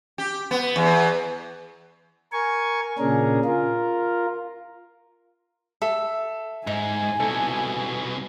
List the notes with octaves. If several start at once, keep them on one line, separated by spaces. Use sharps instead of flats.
G4
B3
E2
A#4 G#5 C#6
A#2 C#3 C#4 D4 G#4 A#4
F4 A#4
A4 E5
G#2 D#4 G#5
C2 B2 A4